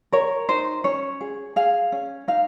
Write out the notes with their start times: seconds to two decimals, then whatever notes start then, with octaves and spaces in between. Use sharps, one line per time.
0.12 A#4 C#5
0.49 D#4 C5
0.84 C#4 C#5
1.21 G#4
1.56 G#4 F5
1.92 C#4
2.28 D#4 F5